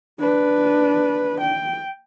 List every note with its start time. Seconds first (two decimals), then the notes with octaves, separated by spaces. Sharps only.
0.20 D4 B4
1.40 G5